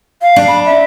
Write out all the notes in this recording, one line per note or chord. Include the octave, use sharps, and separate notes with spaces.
F5
D4
B5
E5